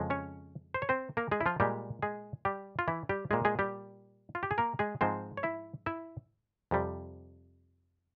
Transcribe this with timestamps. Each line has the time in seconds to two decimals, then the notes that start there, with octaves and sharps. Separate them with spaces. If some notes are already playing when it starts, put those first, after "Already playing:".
Already playing: F2 C#3 F3 G#3
0.10 C#4 C#5
0.74 C5
0.82 C#5
0.89 C4 C5
1.17 A#3 A#4
1.31 G#3 G#4
1.41 E4
1.46 F3 F4
1.60 A#2 G3 G#3 G4
2.02 G#3 G#4
2.45 G3 G4
2.79 F4
2.88 E3 E4
3.09 G3 G4
3.31 A#2 G#3 G#4
3.45 G#3 G#4
3.59 G3 G4
4.35 F4
4.43 G4
4.51 G#4
4.58 A#3 A#4
4.79 G#3 G#4
5.01 G#2 F3 G#3 C4 C5
5.37 C#5
5.43 E4 E5
5.86 E4 E5
6.71 F2 C3 G3